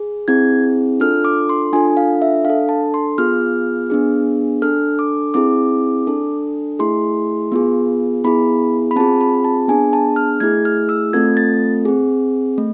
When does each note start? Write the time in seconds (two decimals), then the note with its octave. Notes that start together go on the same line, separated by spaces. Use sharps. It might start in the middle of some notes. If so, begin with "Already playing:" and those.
Already playing: G#4
0.28 C4 E4 G#4 G#6
1.00 D4 F4 A4 F6
1.25 D6
1.49 C6
1.73 D4 F4 A4 G#5
1.97 F5
2.22 E5
2.45 D4 A4 F5
2.69 A5
2.94 C6
3.18 B3 F4 G#4 F6
3.90 B3 D4 G#4
4.62 D4 A4 F6
4.99 D6
5.34 C4 E4 G#4 D6
6.07 D4 A4
6.79 A3 E4 G#4 C6
7.52 B3 F4 G#4
8.24 B3 E4 G#4 B5
8.91 B5
8.96 C4 F4 G#4 A5
9.21 B5
9.44 A5
9.68 B3 D4 G#4 G#5
9.93 A5
10.16 F6
10.40 A3 E4 G#4 G#6
10.65 F6
10.89 E6
11.13 A3 C4 F4 A4 G#6
11.37 A6
11.85 C4 G#4
12.58 A3